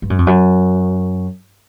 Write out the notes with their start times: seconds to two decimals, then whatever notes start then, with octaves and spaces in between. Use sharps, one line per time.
0.02 G2
0.10 F#2
0.19 F2
0.27 F#2